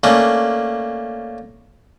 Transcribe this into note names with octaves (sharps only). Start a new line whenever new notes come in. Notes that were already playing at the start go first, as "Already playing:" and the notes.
A3 A#3 C#4 D4